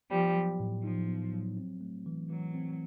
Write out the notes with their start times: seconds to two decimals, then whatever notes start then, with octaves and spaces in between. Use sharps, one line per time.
0.11 F3 G3 B3
0.35 F#3
0.60 A2
0.84 F3 D#4
1.08 B3
1.33 F#3
1.57 C4
1.81 A3
2.06 E3
2.29 E3 F#3
2.54 C4